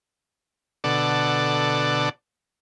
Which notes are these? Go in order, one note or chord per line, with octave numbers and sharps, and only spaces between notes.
B2 D3 A4 D5 F#5